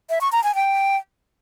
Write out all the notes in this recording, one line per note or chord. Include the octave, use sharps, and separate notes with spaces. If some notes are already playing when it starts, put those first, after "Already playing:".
E5
C#6
A#5
G#5
G5